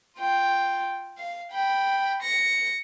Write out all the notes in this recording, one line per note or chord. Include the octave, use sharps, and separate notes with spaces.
F4 G5
F5
G5 B5
A#6 C#7